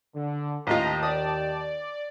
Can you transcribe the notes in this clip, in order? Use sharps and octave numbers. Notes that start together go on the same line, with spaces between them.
D3
A1 D#2 F4 D#5 G5 A5 A#5
D5 D#6